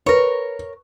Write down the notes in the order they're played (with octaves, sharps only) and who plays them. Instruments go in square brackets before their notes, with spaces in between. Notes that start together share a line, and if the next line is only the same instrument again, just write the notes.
[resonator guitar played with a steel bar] A#4 C#5 [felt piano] B4